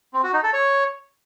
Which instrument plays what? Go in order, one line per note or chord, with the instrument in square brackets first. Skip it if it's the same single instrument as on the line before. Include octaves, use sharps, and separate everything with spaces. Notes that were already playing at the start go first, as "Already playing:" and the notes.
[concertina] C4
F#4
D#4
A4
C#5